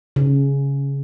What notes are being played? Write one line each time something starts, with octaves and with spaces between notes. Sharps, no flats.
C#3